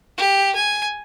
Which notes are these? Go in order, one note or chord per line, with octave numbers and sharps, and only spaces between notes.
G4
G#5